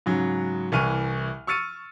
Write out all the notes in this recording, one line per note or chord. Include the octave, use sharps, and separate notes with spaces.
G#2 C#3 F#3
C2 E3 C#6 F6 D#7
C#6 E6 F6 A6 C#7 D#7